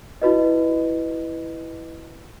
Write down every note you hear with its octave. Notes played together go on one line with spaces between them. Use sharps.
E4 F#4 B4 D#5